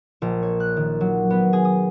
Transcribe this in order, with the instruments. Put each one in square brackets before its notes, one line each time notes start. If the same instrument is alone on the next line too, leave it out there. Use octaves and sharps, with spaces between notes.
[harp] A#1
C#5
F#6
D#3
F#3
B3
G#4
D#6